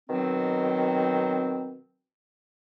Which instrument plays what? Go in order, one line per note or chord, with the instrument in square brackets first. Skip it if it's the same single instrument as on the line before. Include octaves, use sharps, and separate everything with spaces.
[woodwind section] B2 D#3 F#3 C4